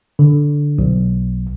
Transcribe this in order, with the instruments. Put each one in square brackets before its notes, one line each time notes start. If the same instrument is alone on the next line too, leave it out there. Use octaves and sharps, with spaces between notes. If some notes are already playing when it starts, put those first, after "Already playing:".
[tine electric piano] D3
B1